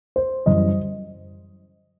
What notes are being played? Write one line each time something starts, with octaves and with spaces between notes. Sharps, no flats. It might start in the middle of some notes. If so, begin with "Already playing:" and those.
C5
F#2 E3 G3 D#5